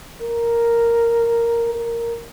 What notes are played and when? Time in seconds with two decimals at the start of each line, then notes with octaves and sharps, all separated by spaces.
0.22 A#4
1.73 A#4